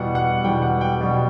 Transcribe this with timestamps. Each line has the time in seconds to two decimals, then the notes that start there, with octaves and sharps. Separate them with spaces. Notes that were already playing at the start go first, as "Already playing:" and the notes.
Already playing: E2 B2 G3 F#5
0.15 F#5
0.44 E2 B2 G3 G5
0.62 F#5
0.81 G5
1.01 B2 G3